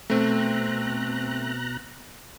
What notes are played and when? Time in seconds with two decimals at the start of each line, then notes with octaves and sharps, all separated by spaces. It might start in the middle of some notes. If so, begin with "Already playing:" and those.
0.10 B2 A3 C4 A#5 F#6